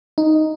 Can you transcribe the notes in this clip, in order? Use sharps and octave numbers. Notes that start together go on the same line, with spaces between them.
D#4